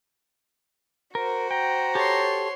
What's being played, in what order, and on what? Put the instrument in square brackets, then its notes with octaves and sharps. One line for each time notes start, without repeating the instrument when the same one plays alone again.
[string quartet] F#4 C5 [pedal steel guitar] A#4
[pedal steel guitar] G5 [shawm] A#5
[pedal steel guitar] G4 A4 [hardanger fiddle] C#5 C6